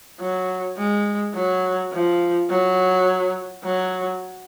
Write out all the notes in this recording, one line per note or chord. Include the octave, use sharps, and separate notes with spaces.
F#3
G#3
F#3
F3
F#3
F#3